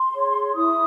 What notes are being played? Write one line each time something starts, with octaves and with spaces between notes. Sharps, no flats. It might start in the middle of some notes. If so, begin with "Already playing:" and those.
Already playing: C6
G#4 C#5
E4 D#6